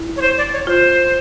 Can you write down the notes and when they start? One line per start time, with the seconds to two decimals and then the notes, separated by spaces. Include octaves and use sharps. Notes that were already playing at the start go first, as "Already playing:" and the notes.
Already playing: E4
0.16 C#5
0.21 C5
0.38 D5
0.52 C#5
0.67 F4 C5